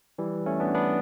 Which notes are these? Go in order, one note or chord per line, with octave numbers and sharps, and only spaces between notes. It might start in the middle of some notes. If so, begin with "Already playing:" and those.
E3 G3
A3 C#4
B3 D4
B3 D4